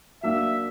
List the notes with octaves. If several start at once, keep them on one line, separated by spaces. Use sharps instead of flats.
F#3 A#3 D4 E5